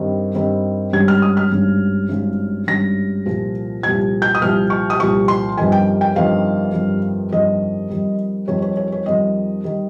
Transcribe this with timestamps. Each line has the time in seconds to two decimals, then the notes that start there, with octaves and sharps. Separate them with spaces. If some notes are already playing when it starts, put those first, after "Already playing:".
Already playing: G2 D#3 G3 C4
0.35 G2 D#3 G3 C4
0.93 G#1 G2 G3 C#4 G#6
1.08 F6
1.22 D#6
1.37 F6
1.52 G#1 G2 G3 C#4
2.09 G#1 G2 G3 C#4
2.67 G#1 G2 G3 C#4 A#6
3.26 C2 A#2 F3
3.83 C2 A#2 F3 G#6
4.22 G6
4.35 D#6
4.42 C2 A#2 F3 F6
4.70 C#6
4.90 D#6
4.99 C2 A#2 F3 C#6
5.28 C6
5.57 G1 F2 D#3 G3 G#5
5.72 G5
6.01 G5
6.16 G1 F2 D#3 G3 F5
6.74 G1 F2 D#3 G3
7.32 G1 F2 D#3 G3 D#5
7.90 F2 D#3 G3
8.48 F2 D#3 G3 C#5
8.62 C#5
8.77 C#5
8.92 C#5
9.06 F2 D#3 G3 D#5
9.64 D#3 G3